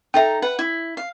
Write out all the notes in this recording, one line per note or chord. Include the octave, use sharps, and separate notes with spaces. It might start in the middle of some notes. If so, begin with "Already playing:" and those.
D#4 A4 E5 G5 A#5
B4 F#5
E4
F5